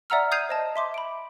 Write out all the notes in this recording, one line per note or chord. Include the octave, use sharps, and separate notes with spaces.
D5 E5 F#5 A#5 E6 F6
D#6 G6 G#6 C7 D#7 F7
C5 D#5 A5
E5 C6 D6
B5 D7